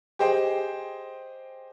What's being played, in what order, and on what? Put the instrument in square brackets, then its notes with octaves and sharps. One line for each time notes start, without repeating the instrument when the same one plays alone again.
[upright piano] G4 G#4 C5 D#5 G5